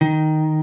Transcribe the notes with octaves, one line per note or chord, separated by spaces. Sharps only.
D#3